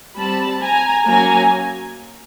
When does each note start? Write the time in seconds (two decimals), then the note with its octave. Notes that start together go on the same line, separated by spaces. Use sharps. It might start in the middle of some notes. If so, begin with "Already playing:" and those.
0.17 G3 C4 A5 B5
0.61 G#5 A#5
1.06 F#3 A#3 C#4 G#5 A#5